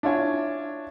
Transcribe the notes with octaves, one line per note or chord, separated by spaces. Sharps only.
D4 E4 F4 C#5 G#5